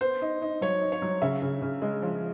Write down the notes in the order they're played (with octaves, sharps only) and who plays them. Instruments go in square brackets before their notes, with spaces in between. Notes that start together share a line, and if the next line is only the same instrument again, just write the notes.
[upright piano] B3 [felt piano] C5
[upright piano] D#4
D#4
[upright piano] F#3 [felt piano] C#5
[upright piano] D#4
[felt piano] C#5
[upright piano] F#3
[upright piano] C#3 [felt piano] E5
[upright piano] C#3
C#3
G#3
F3